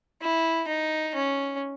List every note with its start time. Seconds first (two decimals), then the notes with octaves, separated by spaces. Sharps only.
0.22 E4
0.68 D#4
1.15 C#4